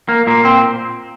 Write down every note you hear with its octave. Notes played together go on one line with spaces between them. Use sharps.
A#3
A#2 A#3
C4